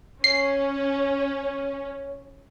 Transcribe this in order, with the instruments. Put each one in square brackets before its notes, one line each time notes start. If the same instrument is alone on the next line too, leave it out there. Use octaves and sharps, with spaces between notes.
[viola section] C#4 [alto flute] C#5 [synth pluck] C7